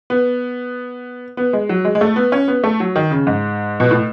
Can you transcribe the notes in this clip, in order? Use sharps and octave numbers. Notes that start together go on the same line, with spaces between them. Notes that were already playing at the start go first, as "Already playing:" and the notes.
B3
B3
G#3
F#3
G#3
G#3
A3
B3
C#4
B3
A3
F#3
D#3
C#3
G#2
B2
A2